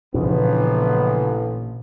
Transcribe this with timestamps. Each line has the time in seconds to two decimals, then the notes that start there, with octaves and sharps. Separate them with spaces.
0.14 A1 A#2 C#3 E3 F3 B3 D4